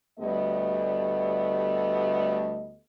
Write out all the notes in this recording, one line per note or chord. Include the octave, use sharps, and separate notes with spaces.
D2 G3 A3 B3 G4 D#5